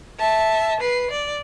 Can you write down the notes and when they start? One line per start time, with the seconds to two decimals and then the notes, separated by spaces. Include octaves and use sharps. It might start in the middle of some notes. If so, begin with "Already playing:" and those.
0.19 E5 A5
0.80 B4 C7
1.11 D5